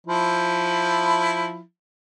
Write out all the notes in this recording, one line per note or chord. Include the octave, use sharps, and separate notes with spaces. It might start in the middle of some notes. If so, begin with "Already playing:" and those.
F3 E4